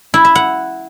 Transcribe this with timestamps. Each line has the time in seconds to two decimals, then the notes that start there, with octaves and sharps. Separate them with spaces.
0.14 E4
0.25 E5
0.35 F#5